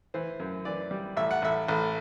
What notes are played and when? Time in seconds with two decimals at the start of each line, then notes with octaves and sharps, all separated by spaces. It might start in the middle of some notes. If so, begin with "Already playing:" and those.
0.14 E3 C5
0.40 F#2
0.65 E3 D5
0.91 G3
1.17 A1 E5
1.31 F#5
1.42 A1 E5
1.68 A1